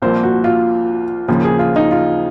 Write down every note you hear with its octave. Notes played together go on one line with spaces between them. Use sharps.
C2 A#2 F3 A#3 C5
F#4
F4
D#2 C#3 F3 A#3
G#4
F4
D#4
F4